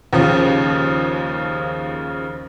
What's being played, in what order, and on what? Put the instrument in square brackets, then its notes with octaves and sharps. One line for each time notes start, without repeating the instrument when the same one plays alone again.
[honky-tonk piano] D#2 C#3 F3